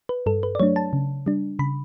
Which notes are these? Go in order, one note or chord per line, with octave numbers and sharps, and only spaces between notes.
B4
G2 A4
B4
D5
F#3 A3 D4 C#5
A5
C#3
G3 D4
C#3 B5